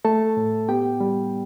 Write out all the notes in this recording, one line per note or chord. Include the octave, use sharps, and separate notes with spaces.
A3 A4 A5
A2
B3 G4 G5
G3